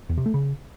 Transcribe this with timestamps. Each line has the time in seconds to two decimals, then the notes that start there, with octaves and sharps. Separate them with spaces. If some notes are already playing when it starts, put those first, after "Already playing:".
0.09 E2
0.18 C3
0.26 A3
0.34 C#3